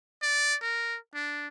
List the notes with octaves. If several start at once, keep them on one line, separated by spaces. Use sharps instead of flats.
D5
A#4
D4